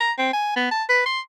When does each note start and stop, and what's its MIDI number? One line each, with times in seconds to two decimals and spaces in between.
0.01 0.12 82
0.18 0.30 60
0.33 0.53 80
0.56 0.69 59
0.71 0.84 81
0.89 1.04 71
1.06 1.20 84